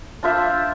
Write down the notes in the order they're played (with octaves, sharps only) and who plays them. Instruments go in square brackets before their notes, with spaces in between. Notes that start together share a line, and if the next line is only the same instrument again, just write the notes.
[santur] D4 F4 C5 E5